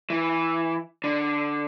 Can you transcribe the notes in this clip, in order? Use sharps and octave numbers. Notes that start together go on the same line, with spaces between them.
E3
D3